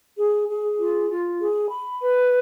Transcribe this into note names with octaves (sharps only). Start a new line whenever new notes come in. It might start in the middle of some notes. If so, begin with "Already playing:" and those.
G#4
G#4
F4
F4
G#4
B5
B4